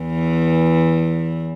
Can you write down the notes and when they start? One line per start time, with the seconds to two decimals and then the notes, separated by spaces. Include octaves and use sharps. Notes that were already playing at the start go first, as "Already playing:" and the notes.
Already playing: E2 E3